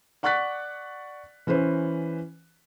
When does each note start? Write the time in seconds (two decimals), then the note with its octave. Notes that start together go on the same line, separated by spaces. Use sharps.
0.23 D5 F#5 C#6 F#6 A6 B6
1.47 E3 C#4 B4 C5